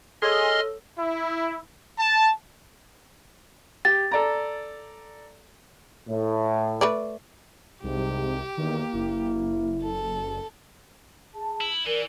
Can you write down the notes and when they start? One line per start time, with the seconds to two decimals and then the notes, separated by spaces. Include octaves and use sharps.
0.22 G#4 A4 C#5 D#5 C6 E6 F6
0.97 E4
1.98 A5
3.85 G4 A6
4.11 A4 D5 A#5
6.09 A2
6.81 A3 B4 D5
7.84 C2 G#2 C3 G4
8.58 E2 D#3 A#3
8.93 F#1 E4
9.82 A4
11.35 G#4 A5
11.61 E4
11.86 E3 A#4 D5